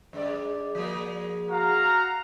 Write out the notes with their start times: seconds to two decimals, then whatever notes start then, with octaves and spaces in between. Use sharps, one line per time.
0.13 F#2 G#3 D5
0.75 F3 G#3 A#3
1.49 F#4 F5 A#5